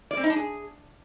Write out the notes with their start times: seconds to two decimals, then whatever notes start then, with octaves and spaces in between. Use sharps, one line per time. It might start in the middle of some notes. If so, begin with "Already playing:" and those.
0.11 D5
0.17 C4
0.24 D#4
0.30 D4
0.36 G#4